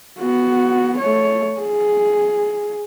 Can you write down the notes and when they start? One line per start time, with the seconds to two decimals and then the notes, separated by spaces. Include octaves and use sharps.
0.20 B3 F#4
0.98 A3 C#5
1.61 G#4